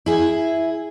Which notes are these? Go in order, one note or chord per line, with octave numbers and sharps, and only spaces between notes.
E4 G#4